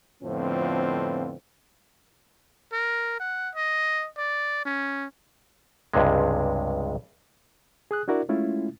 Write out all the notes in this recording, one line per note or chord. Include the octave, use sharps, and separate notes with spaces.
F2 A2 D3 F3 B3 C4
A#4
F#5
D#5
D5
C#4
C#2 G2 C3 G#3
G#4 D#6 F#6
D4 E4 F#4 A#4 D5
G#3 A3 C#4 E4 F4